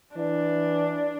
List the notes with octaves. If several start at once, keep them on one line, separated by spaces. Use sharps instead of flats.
E3 D4